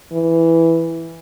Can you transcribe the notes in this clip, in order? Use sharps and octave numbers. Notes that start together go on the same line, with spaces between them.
E3